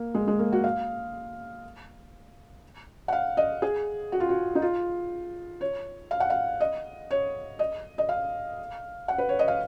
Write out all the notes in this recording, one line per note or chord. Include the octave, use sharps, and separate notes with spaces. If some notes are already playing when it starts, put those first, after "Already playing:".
Already playing: A#3
G#3
G#3
A#3
F#4
F5
F#5
F5
D#5
G#4
F#4
F4
F#4
D#4
F4
C#5
F5
F#5
F5
D#5
C#5
D#5
D#5
F5
F#5
B4
C#5
D#5
F5